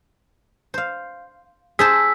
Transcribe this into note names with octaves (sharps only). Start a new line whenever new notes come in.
C5 F5
G#4 C5 A5 E6 B6